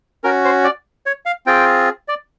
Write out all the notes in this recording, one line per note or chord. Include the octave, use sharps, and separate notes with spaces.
C#4 F#4 A#4
C5
D5
C#5
F5
C4 F4 G#4 G5
D5